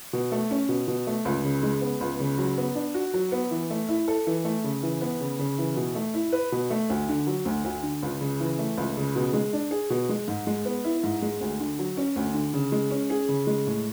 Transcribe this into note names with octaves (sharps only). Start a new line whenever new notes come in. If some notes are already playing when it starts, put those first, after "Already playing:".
B2
A3
C#4
B2
B2
A3
C#2
C#3
G#3
B3
C#2
C#3
F#3
B3
D4
F#4
F#3
B3
E3
A3
E4
A4
E3
A3
C#3
E3
B3
C#3
C#3
E3
B2
A3
E4
B4
B2
A3
D2
D3
F#3
D2
D2
D3
C#2
C#3
E3
A3
C#2
C#3
B2
G#3
D4
G#4
B2
G#3
G#2
G#3
B3
E4
G#2
G#3
D2
D3
F#3
C#4
D2
D3
C#3
G#3
C#4
G#4
C#3
G#3
A2